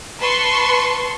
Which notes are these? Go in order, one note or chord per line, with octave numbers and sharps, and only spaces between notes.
B4 A5 C6 C#6